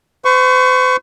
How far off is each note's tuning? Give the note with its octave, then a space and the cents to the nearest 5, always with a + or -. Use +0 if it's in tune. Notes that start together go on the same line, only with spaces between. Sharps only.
C5 -45 C#6 +0